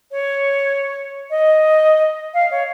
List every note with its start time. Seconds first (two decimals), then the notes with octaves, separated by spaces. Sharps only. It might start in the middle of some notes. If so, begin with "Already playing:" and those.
0.11 C#5
1.30 D#5
2.33 F5
2.50 C#5